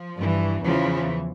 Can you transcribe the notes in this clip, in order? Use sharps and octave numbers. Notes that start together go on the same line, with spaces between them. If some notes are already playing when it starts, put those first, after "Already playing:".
Already playing: F3
G2 E3
E2 C#3 E3 F3